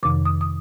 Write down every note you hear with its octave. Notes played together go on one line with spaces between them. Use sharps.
F2 C3 D#3 D6
D#6
D#6